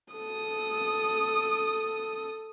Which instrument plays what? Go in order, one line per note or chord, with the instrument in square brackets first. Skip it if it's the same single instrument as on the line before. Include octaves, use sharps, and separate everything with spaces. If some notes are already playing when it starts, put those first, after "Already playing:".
[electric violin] A4 D#6